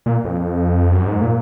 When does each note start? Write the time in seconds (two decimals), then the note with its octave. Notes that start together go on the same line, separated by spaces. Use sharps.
0.06 A#2
0.24 F2
0.92 F#2
1.07 G#2
1.21 A#2